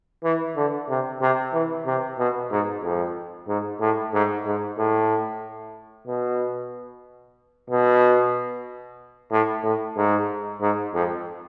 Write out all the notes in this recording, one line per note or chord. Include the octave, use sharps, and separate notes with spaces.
E3
D3
C3
C3
E3
C3
B2
G#2
F2
G#2
A2
G#2
G#2
A2
B2
B2
A2
A2
G#2
G#2
F2